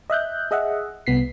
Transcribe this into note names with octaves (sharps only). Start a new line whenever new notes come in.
D#5 E5 F#6 G6
G#4 D#5 E5 F#5
C2 B3 B6 C7